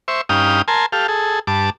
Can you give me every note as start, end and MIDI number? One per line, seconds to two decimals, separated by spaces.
0.08 0.21 72
0.08 0.21 76
0.08 0.21 85
0.29 0.62 43
0.29 0.62 61
0.29 0.62 63
0.29 0.62 77
0.29 0.62 79
0.29 0.62 87
0.68 0.86 70
0.68 0.86 80
0.68 0.86 81
0.68 0.86 84
0.92 1.07 67
0.92 1.07 69
0.92 1.07 77
1.08 1.39 68
1.08 1.39 69
1.47 1.70 43
1.47 1.70 81
1.47 1.70 86